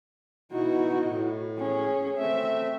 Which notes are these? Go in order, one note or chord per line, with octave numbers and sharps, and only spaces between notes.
B2 D#4 E4 F#4
A2
C#4 G#4
A3 C4 E5